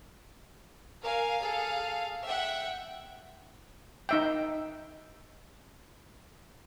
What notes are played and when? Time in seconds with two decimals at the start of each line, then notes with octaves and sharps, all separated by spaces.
1.02 A#4 F5 G#5
1.41 G#4 A4
2.26 E5 F#5 G5
4.09 D#4 E5 G5